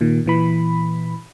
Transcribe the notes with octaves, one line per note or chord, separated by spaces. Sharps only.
A#2 D#3
A#2 E3 B5